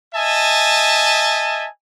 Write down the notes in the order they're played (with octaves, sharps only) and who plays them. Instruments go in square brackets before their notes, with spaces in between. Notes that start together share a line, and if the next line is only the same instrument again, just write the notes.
[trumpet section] D#5 E5 G#5 A5